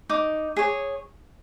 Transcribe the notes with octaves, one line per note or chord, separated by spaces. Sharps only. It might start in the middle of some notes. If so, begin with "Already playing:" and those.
D#4 D6
G#4 C#5